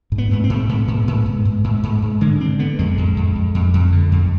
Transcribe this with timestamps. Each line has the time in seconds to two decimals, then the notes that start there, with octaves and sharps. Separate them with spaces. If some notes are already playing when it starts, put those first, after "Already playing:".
0.12 G#2
0.18 B3
0.31 G#2 B3
0.44 C4
0.50 G#2
0.69 G#2 B3
0.88 G#2
1.08 G#2
1.26 G#2
1.45 G#2
1.64 G#2
1.83 G#2
2.02 G#2
2.21 D3 G#3
2.40 D3 C4
2.59 D3 B3
2.79 F2 G#3
2.98 F2
3.17 F2
3.35 F2
3.55 F2
3.74 F2
3.92 D3
4.12 F2